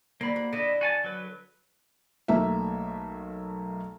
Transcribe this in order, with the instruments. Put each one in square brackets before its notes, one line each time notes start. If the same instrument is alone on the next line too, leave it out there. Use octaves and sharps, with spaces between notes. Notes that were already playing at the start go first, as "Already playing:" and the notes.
[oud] D#2 D3 C4 [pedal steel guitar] A#3 B5
[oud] F#4
[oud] D3 D4 [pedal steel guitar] E4 D#5
[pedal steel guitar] F#4 G#5 A5
F#3 B4
[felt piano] B1 A3 A#3 E5